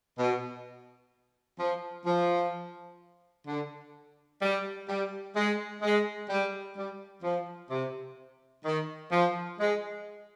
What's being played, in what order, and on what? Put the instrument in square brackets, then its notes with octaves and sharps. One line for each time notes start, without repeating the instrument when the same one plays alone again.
[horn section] B2
F3
F3
D3
G3
G3
G#3
G#3
G3
G3
F3
C3
D#3
F3
G#3